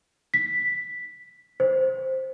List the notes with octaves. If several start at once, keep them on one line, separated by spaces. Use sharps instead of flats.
B6
C5